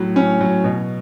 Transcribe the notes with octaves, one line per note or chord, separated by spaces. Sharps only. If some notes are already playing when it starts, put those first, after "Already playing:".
Already playing: A2 F#3
A2 C#4
F#3
B2